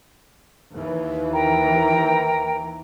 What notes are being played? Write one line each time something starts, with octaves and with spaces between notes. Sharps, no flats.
D#2 E3
A#4 G5 A#5